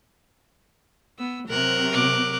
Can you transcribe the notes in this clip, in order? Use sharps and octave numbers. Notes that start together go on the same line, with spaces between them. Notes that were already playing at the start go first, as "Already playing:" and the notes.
B3 E6
C3 F#3 A#4 F#6
D6 F#6